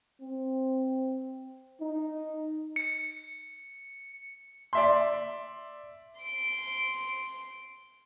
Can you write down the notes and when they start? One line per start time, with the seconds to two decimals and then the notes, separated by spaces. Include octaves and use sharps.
0.21 C4
1.81 D#4
2.76 C#7
4.73 D5 E5 C6
6.21 C6 D7